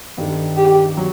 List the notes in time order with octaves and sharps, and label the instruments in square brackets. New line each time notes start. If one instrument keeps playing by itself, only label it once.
[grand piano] G2 D#3 G3 D4 A4
[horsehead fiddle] G4
[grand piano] F#3